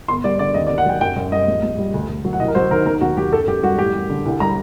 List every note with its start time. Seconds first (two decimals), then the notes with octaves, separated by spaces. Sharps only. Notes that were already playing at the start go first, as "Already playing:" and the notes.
0.08 G1 C6
0.24 G3 D5
0.39 D3 D5
0.54 D#2 D#5
0.67 D5
0.70 D#2
0.78 F#5
0.86 F#3 G5
1.01 F#2 G5
1.16 F#2
1.32 G3 D#5
1.47 A#1
1.63 A#1
1.78 G3
1.94 D2
2.08 D2
2.25 F#3
2.33 F#5
2.40 C2 D#5
2.48 A#4
2.55 F#3 C5
2.71 D#3 A#4
2.86 D#2 A#4
3.01 D#2 F#4
3.17 F#3 G4
3.32 F#2 A4
3.48 F#2 G4
3.63 G3 F#4
3.78 A1 G4
3.94 G3
4.10 D3
4.25 C2
4.40 G3 A#5